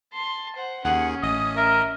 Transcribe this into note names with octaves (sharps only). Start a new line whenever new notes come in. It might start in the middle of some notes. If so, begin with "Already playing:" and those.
A5 C6
C5 F#5
D#2 C#4 G#4 F#5
A1 D#5 D#6
A#4 E5